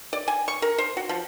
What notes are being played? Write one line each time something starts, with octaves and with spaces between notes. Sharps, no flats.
D5
G#5
C#6
A#4
C5
F#4
F3